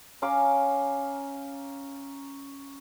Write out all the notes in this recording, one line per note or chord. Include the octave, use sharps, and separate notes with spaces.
C#4 F5 A#5 D6